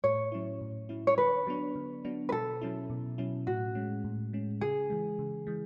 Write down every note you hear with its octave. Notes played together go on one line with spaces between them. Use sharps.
A2 C#5
F#3 C#4 E4
A2
F#3 C#4 E4
C#5
D3 B4
F#3 B3 D4
D3
F#3 B3 D4
B4
B2 A4
F#3 C#4 E4
B2
F#3 C#4 E4
A2 F#4
G#3 C#4
A2
G#3 C#4
C#3 G#4
E3 G#3
C#3
E3 G#3